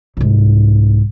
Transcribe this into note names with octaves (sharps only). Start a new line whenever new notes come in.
C2 G#2